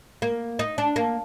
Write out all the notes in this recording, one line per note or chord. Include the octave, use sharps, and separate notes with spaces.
A#3
D#4
D4
A#3